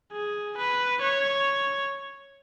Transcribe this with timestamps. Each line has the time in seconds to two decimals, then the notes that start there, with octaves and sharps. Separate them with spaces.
0.13 G#4
0.57 B4
1.02 C#5